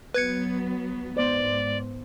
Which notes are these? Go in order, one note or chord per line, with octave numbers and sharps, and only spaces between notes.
F#3 B3 B4 G#6 C#7
G#2 B3 C5 D5